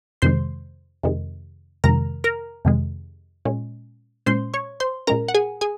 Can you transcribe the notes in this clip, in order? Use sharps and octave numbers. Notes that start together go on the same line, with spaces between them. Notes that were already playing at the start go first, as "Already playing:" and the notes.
F2 C3 D#3 G#3 C5 C6
F2 C3 D#3 G#3
F2 C3 D#3 G#3 A#4 A#5
A#4 A#5
F2 C3 D#3 G#3
A#2 G#3 C#4
A#2 G#3 C#4 C5 C6
C#5 C#6
C5 C6
A#2 G#3 C#4 A#4 A#5
F#5
G#4 G#5
G#4 G#5